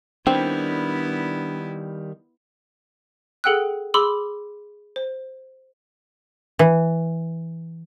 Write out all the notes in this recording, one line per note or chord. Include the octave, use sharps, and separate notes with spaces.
D#3 G3 B3 C4 D4 E4
G#4 A4 F#5 G5 E6 F#6
G#4 B5 C6 D6 E6
C5
E3